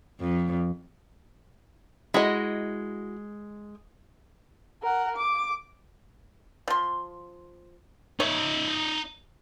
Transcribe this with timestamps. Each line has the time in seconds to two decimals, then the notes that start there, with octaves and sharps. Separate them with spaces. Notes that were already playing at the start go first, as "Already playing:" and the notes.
0.20 F2
2.14 G#3 E4 F#4 D#5
4.83 A#4 F#5
5.17 D6
6.68 F3 C6
8.20 D#4 C#5 E5